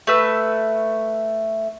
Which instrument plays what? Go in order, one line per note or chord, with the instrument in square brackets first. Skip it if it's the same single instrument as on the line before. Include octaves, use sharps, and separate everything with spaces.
[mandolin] A3 B4 E6